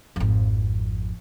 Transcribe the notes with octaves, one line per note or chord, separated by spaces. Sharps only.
G#1 F2